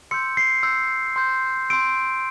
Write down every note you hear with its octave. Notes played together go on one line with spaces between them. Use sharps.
C6 E6 G6 C#7
C7
C6 E6 G6
C6 E6 G6
C6 E6 G6 D7